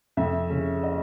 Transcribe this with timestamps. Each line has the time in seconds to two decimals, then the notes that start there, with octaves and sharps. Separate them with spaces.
0.17 F2 E5
0.50 C#3
0.83 D#5